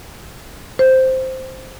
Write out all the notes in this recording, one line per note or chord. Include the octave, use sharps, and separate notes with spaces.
C5